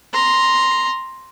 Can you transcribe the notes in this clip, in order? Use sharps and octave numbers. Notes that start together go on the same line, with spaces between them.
A#5 C6